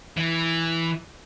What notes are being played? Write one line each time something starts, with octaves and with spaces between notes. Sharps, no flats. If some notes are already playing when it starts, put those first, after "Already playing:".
E3